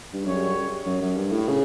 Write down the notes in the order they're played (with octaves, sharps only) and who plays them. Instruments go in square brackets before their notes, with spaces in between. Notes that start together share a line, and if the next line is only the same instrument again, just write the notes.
[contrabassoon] G2
[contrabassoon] F#2 [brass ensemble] C#3 G3 C#4 G4 C#5
[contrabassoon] F#2
F#2
G2
A2
C#3